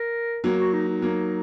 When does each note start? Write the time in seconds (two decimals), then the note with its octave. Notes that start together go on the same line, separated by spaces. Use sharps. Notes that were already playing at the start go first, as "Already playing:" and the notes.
Already playing: A#4
0.44 F#3 A#3
0.58 F#4
0.73 D#4
0.88 D#4
1.02 F#3 A#3